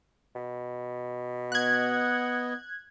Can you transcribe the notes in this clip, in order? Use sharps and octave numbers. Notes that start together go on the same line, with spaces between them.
B2
B3 D#5 F#5 F#6 G#6